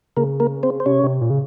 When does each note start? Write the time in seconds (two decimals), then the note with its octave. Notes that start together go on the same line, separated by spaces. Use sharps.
0.17 C#3 A#3 A#4
0.40 A#3 A#4
0.63 C4 C5
0.80 C5
0.86 C3 C#4 C#5
1.03 C3
1.21 A#2
1.30 C#3